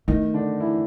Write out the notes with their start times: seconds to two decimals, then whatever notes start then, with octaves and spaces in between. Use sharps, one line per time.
0.08 D#3 A3 D#4
0.34 D3 D4
0.60 E3 E4